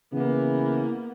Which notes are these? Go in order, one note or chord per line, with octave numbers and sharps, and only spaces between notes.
C#3 E3 A#3 B3